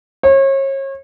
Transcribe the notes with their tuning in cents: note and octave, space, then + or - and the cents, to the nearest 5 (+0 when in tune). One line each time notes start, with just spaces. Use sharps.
C#5 -35